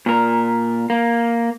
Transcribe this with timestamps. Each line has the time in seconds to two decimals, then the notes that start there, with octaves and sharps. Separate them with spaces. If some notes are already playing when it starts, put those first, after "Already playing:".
0.06 A#2 A#4
0.90 A#3